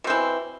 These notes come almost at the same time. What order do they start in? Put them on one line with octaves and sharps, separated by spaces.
B2 C4 E3